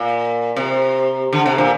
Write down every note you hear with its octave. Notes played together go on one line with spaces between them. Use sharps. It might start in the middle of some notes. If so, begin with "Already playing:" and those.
Already playing: A#2
C3
D3
C3
A#2